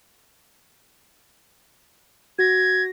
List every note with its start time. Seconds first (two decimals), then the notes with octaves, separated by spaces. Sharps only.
2.39 F#4 G#6 A#6